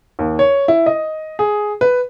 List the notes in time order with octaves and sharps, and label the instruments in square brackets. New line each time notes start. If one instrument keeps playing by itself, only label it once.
[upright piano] D#2
C#5
E4
D#5
G#4
B4